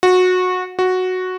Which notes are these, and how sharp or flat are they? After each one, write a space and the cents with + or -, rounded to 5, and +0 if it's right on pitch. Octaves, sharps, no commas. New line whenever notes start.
F#4 -20
F#4 -5